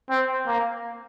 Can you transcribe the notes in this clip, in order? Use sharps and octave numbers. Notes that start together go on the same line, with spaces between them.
C4
A#3